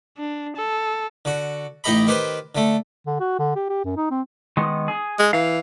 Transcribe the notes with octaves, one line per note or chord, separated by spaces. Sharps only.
D4
A4
D3 F#4
A1 D#4 G4 D#5 A#5 B5
D#3 G4 B4 C5
D3 A3
D3
F#4
D3
G4
G4
F#2
D#4
C4
D#3 G#3 B3
G#4
G#3
E3 F5